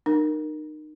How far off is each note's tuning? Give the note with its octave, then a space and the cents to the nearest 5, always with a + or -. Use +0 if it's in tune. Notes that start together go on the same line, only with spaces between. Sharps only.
D#4 -30 A#4 +0